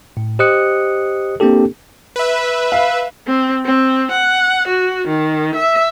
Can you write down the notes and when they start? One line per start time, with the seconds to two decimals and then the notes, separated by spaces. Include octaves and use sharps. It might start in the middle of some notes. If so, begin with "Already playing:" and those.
0.17 A2
0.39 G4 C5 D#5 D#6 F#6 C#7
1.40 A#3 C4 D4 G4 A4
2.16 B4 E5
2.72 F5
3.27 C4
3.65 C4
4.11 F#5
4.68 F#4
5.08 D#3
5.55 E5